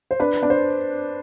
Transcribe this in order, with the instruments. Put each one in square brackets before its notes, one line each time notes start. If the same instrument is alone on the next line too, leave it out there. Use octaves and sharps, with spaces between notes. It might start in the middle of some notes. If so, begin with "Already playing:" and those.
[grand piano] C5
[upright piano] D4 [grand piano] B4
[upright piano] D4
[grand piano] C5